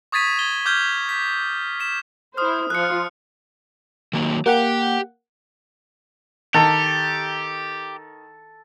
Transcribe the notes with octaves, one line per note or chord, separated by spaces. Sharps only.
C#6 D#6 G#6 A6 B6 D#7
G#6 G7
D6 F6 G6 G#6 G7
B6
B6 E7
E4 C5 D#6 F6
F3 F4 F#6 C#7
D#3 F#3 A#3
A#3 G4 F#5 G5
D#3 G4 A4